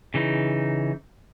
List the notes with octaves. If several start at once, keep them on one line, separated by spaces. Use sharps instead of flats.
C#3 E3 D#4